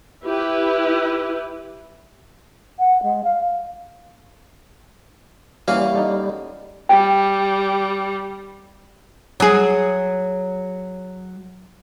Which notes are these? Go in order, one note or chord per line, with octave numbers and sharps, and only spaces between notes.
E4 G4 B4
F#5
G#3
F5
E3 G3 A#3 C#4 F#4 F5 G#5
D#4 A4
G3 G5
F#3 G#4